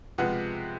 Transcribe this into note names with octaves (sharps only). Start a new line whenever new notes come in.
C3 F3 G#3 B3 F#5